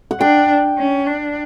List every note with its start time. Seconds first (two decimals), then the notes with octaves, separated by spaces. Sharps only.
0.11 F#5
0.20 D4 G5
0.78 C#4
1.07 D4